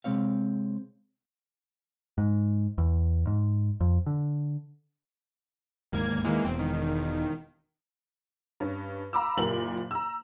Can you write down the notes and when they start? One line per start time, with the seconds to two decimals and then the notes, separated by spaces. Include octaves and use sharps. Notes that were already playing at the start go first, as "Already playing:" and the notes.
0.04 C3 G#3 C4 C#5 F5
2.18 G#2
2.78 E2
3.27 G#2
3.81 F2
4.06 D3
5.93 D1 D#2 G#2 A#3 G#6
6.24 D#2 D#3 E3 G#3 A#3
6.45 E1 E2 C4
6.59 D#3
8.60 G2 C#4
9.13 F5 A#5 B5 D6 E6
9.37 F#1 A#2 G4 A#4 F#7
9.91 A#5 E6